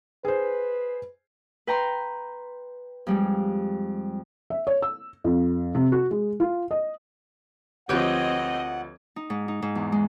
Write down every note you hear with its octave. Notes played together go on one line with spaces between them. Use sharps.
G#4 B4 C5
B4 G5 A#5 C6
F2 G3 G#3
E5
C#5
E6
F2
C3
F#4
G#3
F4
D#5
D2 F3 C4 G4 B4 C#5 D#5 F#5
D#4
G#2
D#4
G#2
E2
G#3